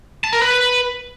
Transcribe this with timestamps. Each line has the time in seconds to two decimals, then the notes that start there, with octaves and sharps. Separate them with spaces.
0.24 A5
0.33 A#4
0.42 B4